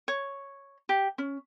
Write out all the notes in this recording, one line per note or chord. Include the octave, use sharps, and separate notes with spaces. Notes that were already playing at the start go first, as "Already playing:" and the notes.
C#5
G4
C#4